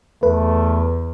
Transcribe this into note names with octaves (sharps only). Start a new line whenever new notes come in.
E2 A3 B4